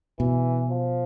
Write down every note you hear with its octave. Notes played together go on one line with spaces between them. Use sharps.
B2 E3
F3